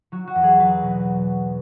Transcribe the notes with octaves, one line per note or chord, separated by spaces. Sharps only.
F#3 F#4
F#4
E2
G#4
F#3 B4
B2